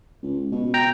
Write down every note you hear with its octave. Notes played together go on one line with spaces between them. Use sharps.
C#2
B2
G5 A#5